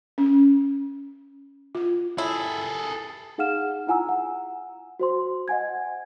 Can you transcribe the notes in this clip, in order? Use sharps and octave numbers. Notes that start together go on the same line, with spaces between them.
C#4
F4
E4 G#4 A4
D#4 G#4 F5 F#5 F6 E7
E4 F4 F#5 G#5 A#5 E6
F#5
F#4 C5 C6
D#5 F#5 G#5 G#6